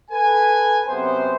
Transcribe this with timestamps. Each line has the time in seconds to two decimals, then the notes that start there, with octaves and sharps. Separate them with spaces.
0.11 A4 B4 G#5
0.87 F#2 C3 B3 C5